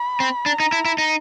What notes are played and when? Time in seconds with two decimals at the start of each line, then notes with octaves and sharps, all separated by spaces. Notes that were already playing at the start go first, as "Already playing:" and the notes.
Already playing: B5
0.20 C4
0.46 D4 A#5
0.60 D#4
0.72 E4
0.85 E4
0.98 D#4